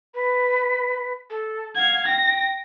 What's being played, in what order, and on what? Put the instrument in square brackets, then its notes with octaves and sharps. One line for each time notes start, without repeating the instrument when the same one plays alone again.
[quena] B4
A4
[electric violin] F5 G#6 [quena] F#5
[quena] G5 [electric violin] A#6